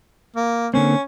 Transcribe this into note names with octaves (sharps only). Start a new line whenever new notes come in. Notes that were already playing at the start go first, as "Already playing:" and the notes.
A#3
D3 A#3 C4 C#4